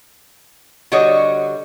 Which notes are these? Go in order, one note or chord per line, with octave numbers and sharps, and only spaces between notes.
D3 G3 F#4 C#5 D#5